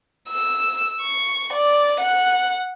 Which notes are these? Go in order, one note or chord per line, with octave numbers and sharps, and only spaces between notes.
E6
C#6
D5
F#5